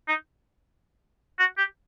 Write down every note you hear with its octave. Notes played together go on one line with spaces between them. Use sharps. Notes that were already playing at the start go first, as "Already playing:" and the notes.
D#4
F#4
G4